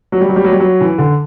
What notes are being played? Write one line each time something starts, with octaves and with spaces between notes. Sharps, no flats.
F#3
G3
F#3
G3
F#3
G3
F#3
E3
D3